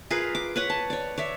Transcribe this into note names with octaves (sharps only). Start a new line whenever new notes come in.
F4 G#4 A#4 B4
D6
B4 C#5 F#5
A5
C#5 D5
C#5 D5 E5